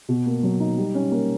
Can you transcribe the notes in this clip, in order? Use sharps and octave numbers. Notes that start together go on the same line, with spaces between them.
B2
A#3
F#3
D#4
G3
C#4
A#3